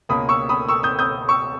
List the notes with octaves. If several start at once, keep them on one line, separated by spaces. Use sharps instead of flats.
C#2 B2 A#3 C#4 B5 D#6
C#6 E6
B5 D#6
C#6 E6
D#6 G6
D#6 G6
C#6 E6